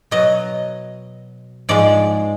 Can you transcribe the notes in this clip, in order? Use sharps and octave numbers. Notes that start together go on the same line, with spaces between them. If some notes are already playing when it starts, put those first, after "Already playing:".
B2 F#3 D#5
G#2 F3 G#3 D5